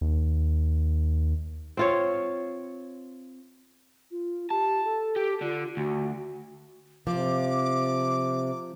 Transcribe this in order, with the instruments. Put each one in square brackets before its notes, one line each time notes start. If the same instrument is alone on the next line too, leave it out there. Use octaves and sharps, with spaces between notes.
[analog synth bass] D#2
[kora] C4 F4 C#5
[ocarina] F4
[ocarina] G4 [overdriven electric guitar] A5
[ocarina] A4
[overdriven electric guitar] G4
[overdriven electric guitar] D3 [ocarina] F4
[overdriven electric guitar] D2 [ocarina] F#4
[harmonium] C3 [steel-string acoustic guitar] F3 [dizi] D6